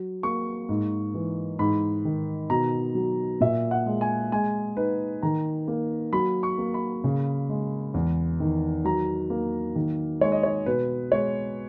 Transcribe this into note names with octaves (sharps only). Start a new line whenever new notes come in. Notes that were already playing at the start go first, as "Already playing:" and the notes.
Already playing: F#3
A#3 C#6
G#2
E3
G#2 B5
D#3
B2 A#5
F#3
A#2 E5
F#5
G#3
G#5
G#3 G#5
D#4 B4
D#3 A#5
A#3
F#3 B5
C#6
A#3
B5
C#3
G#3
E2
D#3
F#3 A#5
A#3
D#3
G#3 C#5
D#5
C#5
B2 B4
G#3 C#5